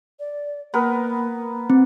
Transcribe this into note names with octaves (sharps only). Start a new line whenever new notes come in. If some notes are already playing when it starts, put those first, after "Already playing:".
D5
A#3 B3 A#4 B4
C4